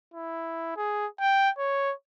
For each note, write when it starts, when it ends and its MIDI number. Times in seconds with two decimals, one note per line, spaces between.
0.14 0.75 64
0.76 1.06 68
1.20 1.50 79
1.58 1.93 73